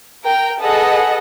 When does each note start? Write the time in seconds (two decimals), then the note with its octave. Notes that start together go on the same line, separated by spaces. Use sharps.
0.25 A#4 G5
0.61 G#4 A4 B4 D#5 F#5